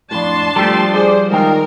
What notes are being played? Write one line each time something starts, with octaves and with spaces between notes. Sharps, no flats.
F2 A2 D4 A5 C6
F3 G3 A3 G4 A4
G#4 C5 D5
D#3 G#3 F4 A#4 G5